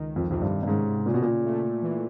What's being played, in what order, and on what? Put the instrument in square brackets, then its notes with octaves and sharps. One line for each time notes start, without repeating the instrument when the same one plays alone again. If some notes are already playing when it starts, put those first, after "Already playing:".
Already playing: [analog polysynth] C#2 D#3
[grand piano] F2
[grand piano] F2 [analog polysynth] C3
[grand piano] G2
G2
[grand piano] G#2 [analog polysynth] C#3
[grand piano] A#2 [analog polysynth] C#3
[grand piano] B2
A#2
[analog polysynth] A3
E3